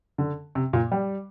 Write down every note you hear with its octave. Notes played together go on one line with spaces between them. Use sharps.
D3
C3
A#2
G3